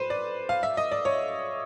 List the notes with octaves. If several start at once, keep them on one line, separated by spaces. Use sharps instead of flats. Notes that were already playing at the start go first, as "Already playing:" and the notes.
Already playing: B4 C5
D5
F5
E5
D#5
D5
C#5